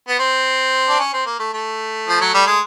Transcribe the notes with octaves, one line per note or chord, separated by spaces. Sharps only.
B3
C4
D4
C#4
C4
A#3
A3
A3
F3
F#3
G3
G#3